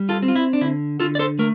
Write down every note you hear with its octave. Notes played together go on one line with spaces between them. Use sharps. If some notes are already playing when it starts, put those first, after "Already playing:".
Already playing: G3
F4 A4
C4
F4
E4
D4
D3 E4
D3 F4 A4
D5
A4 C5
A3 A#4